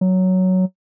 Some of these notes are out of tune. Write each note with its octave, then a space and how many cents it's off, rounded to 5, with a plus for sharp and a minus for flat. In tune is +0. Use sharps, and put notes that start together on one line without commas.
F#3 +5